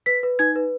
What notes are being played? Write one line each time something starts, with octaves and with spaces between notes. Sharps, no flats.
B4 B6
B4
D#4 G#6
B4